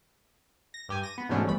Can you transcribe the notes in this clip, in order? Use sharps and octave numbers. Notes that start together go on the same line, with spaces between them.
A#6
G2 G4 G#5
A#6 D#7
B3
E2 G#2 B2 A3 C#4 D4
G#1 G2 E3 A3 B5